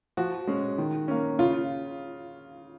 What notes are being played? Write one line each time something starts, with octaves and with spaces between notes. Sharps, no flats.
F3 F#4
G#3 C#4
D#3
A#3 C#4
C#3 F4